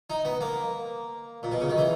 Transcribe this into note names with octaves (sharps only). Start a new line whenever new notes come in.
D#4
B3
A#3
A#2
B2
C#3
D#3
E3